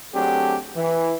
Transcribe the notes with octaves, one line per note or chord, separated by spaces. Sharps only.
F#3 A3 C4 D4 G4 G#4
E3